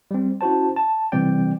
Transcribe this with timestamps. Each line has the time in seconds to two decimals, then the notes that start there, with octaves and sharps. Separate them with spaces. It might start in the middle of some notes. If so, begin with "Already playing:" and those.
0.11 G3 C4
0.41 C#4 E4 F#4 C5 A5
0.76 A5
1.12 C3 E3 G3 C4 D5 G5